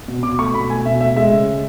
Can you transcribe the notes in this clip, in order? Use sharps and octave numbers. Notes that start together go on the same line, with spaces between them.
B2
B2 D6
A3 C#6
B2 B5
A3 G#5
B2 E5
A3 E5
G#3 E5
C#3